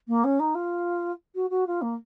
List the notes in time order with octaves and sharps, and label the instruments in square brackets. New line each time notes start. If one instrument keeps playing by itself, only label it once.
[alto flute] A#3
C#4
D#4
F4
F#4
F#4
F4
A#3